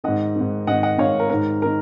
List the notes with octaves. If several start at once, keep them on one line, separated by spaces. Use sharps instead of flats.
G#2 D#3 D#5 F#5
G#2 D#3
G#2 D#3 D#5 F#5
D#5 F#5
G#2 D#3 C#5 F5
A#4
G#2 D#3 A#4
D#3 A#4